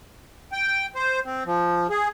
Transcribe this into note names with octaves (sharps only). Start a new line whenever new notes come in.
G5
C5
C4
F3
G#4